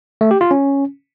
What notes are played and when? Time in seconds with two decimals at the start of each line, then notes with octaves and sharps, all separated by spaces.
0.21 A3
0.31 G4
0.41 F4
0.51 C#4